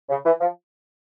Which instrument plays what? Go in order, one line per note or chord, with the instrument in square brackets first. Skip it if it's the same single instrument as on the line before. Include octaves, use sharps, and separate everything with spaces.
[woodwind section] C#3
E3
F3